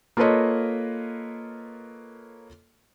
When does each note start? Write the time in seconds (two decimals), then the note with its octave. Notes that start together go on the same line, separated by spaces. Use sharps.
0.17 A#3 F4 A4 B4 C#5 D#5